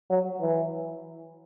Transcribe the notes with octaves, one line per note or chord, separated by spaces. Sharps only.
F#3
E3